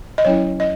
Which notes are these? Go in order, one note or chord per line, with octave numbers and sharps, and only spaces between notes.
D#5
F#3 C#4 E4 C#5
D#5